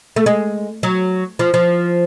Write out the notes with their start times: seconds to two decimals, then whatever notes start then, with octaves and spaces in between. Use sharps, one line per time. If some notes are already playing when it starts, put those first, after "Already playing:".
0.16 A3
0.26 G#3
0.83 F#3
1.39 F3
1.54 F3